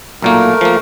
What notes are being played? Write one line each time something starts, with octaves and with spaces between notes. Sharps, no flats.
B1 A#2 A3 A#3 A#4
F3 A#3